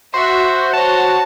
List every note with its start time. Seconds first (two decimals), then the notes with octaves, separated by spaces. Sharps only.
0.14 F#4 C5 E5
0.74 C5 C#5 A5